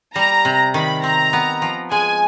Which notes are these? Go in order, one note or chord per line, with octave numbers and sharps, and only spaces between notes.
G3 A#5
C3
D#3 B5
C4 A#5
B3
F3
G#3 G#5